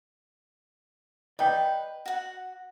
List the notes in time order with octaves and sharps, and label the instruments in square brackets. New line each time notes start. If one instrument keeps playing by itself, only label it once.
[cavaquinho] B4 [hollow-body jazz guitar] D5 D#5 G5
[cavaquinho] F#4 F#5